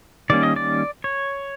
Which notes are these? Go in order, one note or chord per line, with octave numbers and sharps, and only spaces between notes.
D#3 G3 A#3 C#4 D5
D#5
D5
C#5